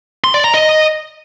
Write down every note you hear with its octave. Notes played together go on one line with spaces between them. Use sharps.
C6
D5
A#5
D#5